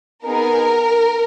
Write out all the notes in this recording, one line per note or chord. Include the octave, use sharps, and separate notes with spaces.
B3 D#4 G#4 A#4